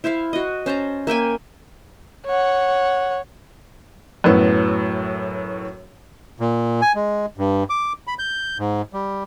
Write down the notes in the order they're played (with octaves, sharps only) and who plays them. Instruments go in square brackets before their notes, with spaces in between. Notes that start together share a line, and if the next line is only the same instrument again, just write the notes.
[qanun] E4 C5 E5 F5
F#4 D#5
C#4 C5 A5 A#5
A#3 E5 G5 G#5
[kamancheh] C#5 F#5
[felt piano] F#2 A2 B3
[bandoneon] A#2
G#5
G#3
G2
D6
B5
G6
G#2
G3